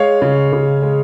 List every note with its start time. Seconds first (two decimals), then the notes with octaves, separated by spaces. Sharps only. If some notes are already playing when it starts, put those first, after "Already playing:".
Already playing: G#3 C#5 F5
0.22 C#3
0.53 C#3
0.82 G#3